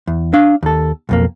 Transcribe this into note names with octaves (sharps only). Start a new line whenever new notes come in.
E2
D4 F5
D#2 A4
B1 F2 A#3